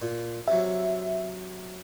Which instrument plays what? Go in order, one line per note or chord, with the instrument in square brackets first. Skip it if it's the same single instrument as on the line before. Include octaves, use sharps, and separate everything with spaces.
[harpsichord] A#2
[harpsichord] C3 F#3 [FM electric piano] E5